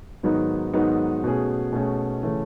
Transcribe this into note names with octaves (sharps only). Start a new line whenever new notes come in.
G#2 D#3 F#3 B3 D#4
G#2 D#3 F#3 B3 D#4
B2 A3 C#4 G#4
B2 A3 C#4 G#4
C#3 E3 A3 C#4